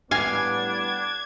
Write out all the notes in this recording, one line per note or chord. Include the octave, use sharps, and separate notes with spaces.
A2 G3 B3 D4 F5 G#5 G#6